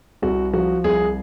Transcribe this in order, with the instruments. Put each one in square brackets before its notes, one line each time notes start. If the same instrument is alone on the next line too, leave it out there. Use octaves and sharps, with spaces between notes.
[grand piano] C2 F#4
F3 F#4
C2 G#4